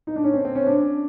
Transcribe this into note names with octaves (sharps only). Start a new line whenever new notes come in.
D#4
D4
C#4
C4
C4
C#4
D4